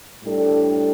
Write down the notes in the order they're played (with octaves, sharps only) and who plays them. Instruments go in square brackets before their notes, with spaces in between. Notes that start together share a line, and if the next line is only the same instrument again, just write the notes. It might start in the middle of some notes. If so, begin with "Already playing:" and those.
[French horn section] A2 G3 D4 A4